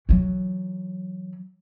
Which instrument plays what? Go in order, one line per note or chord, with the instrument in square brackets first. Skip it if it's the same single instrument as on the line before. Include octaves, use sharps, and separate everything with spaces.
[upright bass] E3 F#3